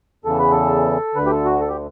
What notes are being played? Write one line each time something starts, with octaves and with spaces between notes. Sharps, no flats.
E2 C#3 E3 A4
B4
A4
D2 D3 B4
G4
A4
F#4
A4
G4